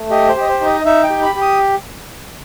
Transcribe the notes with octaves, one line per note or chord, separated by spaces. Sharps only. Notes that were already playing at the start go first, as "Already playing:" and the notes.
Already playing: A3
G4 D#5
C5
G4
D#5
C5
D#4
D#5
D#4 E5
G5
G4
B5
G4
D#6